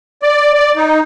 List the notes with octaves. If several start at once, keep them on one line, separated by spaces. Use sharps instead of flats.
D5
D5
D#4